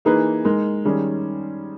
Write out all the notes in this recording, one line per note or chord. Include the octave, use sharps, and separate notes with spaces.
E3 A#3 D#4 G#4 B4
G#3 D#4 A#4
D#3 G3 C#4 G#4